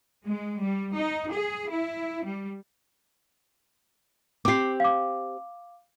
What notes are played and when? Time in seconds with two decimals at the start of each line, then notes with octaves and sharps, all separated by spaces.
0.24 G#3
0.59 G3
0.94 D#4
1.30 G#4
1.68 E4
2.23 G3
4.45 C4 G4 D6 C7
4.80 F5 D6